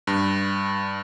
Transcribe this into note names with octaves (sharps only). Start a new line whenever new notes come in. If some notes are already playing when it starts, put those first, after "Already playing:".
G2